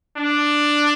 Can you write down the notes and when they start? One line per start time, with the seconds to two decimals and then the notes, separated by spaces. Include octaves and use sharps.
0.17 D4